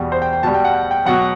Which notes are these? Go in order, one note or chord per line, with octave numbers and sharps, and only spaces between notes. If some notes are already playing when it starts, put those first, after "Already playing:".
Already playing: E2 B2 G3
C5
G5
G5
B2 G3 A5
G5
F#5
G5
G5
B2 F#3 F#5